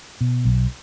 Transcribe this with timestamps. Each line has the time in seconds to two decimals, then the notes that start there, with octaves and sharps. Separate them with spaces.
0.21 B2
0.45 B1